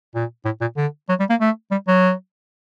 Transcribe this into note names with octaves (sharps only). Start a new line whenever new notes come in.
A#2
A2
A#2
D3
F#3
G3
A#3
A3
G3
F#3